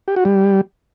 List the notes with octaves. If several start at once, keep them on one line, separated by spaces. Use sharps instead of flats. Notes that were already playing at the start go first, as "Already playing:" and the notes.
G4
F#4
G3